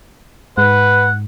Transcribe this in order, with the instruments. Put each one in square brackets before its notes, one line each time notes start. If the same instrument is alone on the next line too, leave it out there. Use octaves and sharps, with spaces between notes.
[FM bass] G#2 [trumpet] B4 [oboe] F#5